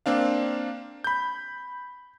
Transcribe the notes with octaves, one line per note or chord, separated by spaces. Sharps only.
A#3 C4 D4 F5
B5 G6